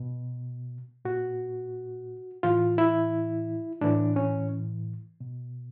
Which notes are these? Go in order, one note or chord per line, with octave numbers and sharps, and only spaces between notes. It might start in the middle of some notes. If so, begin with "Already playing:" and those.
Already playing: B2
A#2 F#4
A2 E3 F4
E4
A2 E3 D4
C#4
B2